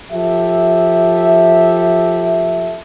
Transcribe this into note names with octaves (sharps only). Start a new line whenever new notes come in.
F3 G4 A4 E5